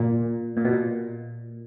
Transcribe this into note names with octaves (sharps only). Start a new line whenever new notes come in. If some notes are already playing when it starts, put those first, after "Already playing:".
Already playing: A#2
A#2
B2
A#2